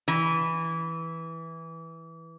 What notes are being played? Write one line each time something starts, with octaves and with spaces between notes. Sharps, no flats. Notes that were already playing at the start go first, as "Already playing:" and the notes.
E3